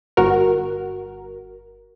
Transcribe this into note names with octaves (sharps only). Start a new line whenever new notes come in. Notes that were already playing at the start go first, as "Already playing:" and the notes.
G1 F#4 A#4